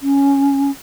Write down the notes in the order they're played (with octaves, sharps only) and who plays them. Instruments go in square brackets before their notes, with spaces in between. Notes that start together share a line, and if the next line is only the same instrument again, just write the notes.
[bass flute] C#4